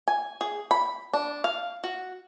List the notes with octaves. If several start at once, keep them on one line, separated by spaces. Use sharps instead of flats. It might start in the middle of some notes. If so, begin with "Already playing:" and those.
G#5
G#4
B5
D4
F5
F#4